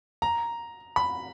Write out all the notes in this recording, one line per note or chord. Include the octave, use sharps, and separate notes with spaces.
A#5
B5